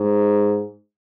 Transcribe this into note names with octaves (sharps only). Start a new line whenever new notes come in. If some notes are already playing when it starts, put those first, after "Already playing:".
Already playing: G#2